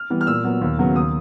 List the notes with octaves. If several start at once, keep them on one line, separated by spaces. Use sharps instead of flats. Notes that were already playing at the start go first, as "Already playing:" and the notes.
Already playing: F6
E3 G3 B3
F6
A#2 E6
F#3 B3
D#2
C#3 F#3 B3
D#2 D#6